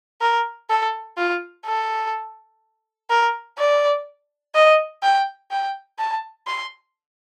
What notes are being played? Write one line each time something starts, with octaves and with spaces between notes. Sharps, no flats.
A#4
A4
F4
A4
A#4
D5
D#5
G5
G5
A5
C6